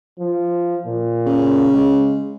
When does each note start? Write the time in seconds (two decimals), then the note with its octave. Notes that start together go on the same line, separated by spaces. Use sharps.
0.19 F3
0.86 A#2
1.27 C#3
1.73 G#3